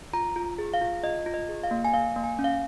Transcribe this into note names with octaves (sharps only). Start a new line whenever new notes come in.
F4 A#5
F4
G#4
F5
F4
F4 D#5
F4
D#5
G#4
F5
A#3
G#5
A#3 F5
A#3
G#5
C#4
F5